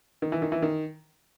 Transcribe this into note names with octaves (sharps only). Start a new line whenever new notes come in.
D#3
E3
D#3
E3
D#3